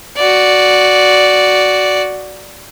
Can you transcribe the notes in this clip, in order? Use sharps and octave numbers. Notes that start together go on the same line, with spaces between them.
F#4 D5